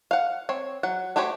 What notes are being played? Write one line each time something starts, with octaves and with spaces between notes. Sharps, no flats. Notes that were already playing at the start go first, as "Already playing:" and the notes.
F5 F#5
C4 C#5
F#3 F#5
A3 F#4 G4 C5 C#5